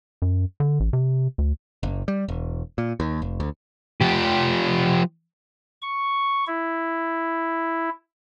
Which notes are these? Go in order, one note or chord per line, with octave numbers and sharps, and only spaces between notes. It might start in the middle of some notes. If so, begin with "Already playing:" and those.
F#2
D3
A1
C3
D2
F#1
G3
E1
A#2
D#2
F1
D2
F3 G4
C#6
E4